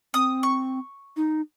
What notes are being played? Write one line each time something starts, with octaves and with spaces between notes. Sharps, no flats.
C4 D#6
C#6
D#4